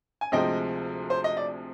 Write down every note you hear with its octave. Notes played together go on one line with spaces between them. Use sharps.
G#5
D2 C3 F3 G#3 D#5 G5
C5
D#5
D5